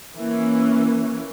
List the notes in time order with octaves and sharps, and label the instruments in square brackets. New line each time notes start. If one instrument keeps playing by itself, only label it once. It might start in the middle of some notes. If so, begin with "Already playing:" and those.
[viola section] E3 A#3 C#4